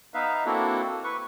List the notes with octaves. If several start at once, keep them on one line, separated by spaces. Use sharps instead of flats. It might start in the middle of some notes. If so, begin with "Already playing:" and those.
B3 D#4 B4 E5 F5
A#3 C4 D4 E4 F#4 A4
B4 C#6